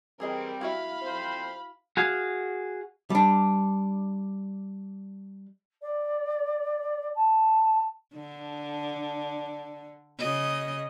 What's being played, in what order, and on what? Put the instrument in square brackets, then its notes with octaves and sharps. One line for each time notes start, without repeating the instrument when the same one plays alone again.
[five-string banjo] E3 G#4 D#5 [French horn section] G3 C4 [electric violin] A#4
[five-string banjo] E4 F#4 E5 [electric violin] F5 B5
[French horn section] F2 C4 C5
[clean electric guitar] F#4 G#4 F5
[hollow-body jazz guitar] G3 D4
[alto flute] D5
A5
[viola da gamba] D3 [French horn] D4
[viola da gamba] C#3 D#5